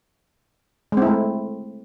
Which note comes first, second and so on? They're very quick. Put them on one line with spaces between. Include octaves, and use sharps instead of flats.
G#3 C4 E4 A3